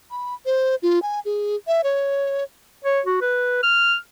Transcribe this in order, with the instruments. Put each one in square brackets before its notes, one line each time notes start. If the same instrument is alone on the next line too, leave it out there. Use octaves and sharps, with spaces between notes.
[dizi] B5
C5
F4
G#5
G#4
E5
C#5
[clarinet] C#5
F#4
B4
F6